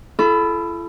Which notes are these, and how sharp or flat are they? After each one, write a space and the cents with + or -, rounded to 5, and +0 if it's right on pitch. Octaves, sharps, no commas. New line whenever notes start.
E4 +45 A4 -25 B5 +15